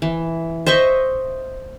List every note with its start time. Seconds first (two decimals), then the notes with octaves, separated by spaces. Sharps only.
0.02 E3
0.66 C5 D#5 E5 C#6